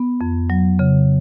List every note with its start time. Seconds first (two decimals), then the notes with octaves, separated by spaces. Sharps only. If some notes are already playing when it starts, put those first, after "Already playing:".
Already playing: B3
0.21 F2
0.50 F#3
0.79 C#3